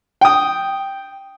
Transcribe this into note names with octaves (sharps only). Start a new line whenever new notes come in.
G5 D#6